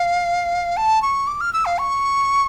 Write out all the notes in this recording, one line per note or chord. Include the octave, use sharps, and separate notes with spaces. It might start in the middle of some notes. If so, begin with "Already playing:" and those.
Already playing: F5
A5
C#6
D6
F6
E6
F5
C#6